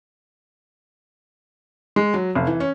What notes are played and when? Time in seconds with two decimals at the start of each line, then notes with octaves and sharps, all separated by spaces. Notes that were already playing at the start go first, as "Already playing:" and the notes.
1.96 G#3
2.14 F#3
2.35 F1
2.47 E3
2.60 C#4